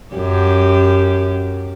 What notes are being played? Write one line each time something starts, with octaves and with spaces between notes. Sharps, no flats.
F#2 G4